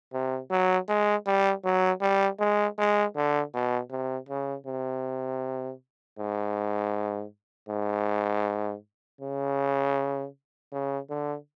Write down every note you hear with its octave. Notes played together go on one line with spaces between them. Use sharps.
C3
F#3
G#3
G3
F#3
G3
G#3
G#3
D3
B2
C3
C#3
C3
G#2
G#2
C#3
C#3
D3